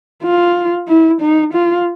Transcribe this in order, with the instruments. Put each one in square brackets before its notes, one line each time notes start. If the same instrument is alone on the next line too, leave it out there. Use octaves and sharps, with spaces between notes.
[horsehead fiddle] F4
E4
D#4
F4